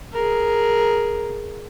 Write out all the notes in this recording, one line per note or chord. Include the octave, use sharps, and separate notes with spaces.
G#4 A#4